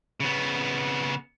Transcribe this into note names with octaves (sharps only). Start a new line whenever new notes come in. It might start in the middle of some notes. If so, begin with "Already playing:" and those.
C#3 B3